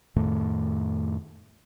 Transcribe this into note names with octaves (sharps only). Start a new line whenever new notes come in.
F2 A2 D#3 A3